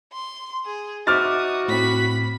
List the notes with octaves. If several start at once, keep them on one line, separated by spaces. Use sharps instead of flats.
C6
G#4
D#4 F#4 C5 E5 D6 D#6 F6 A6
A2 C4 B5 B6